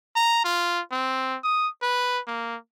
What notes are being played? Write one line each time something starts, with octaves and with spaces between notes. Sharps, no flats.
A#5
F4
C4
D#6
B4
A#3